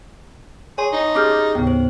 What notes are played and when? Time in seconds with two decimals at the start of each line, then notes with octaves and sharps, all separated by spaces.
0.78 G#4 C#5 C6
0.93 D#4
1.15 C#4 G4 G#4 D6 F6 G6
1.55 D#2 A2 C#3 B3
1.67 C5